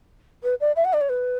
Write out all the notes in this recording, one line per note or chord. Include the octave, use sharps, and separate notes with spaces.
B4
D5
E5
F#5
D5
C#5
B4